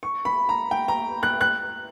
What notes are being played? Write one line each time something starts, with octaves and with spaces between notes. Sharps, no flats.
C#6
B5
A#5
G5
A#5
F#6
F#6